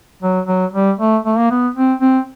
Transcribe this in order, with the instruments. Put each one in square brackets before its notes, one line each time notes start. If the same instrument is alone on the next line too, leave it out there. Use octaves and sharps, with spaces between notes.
[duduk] F#3
F#3
G3
A3
A3
A#3
B3
C4
C4